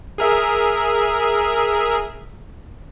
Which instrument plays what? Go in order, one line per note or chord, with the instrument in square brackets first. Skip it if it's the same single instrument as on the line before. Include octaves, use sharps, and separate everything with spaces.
[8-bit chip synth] G#4 A#4 E5